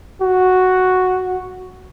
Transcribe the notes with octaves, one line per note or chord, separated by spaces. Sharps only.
F#4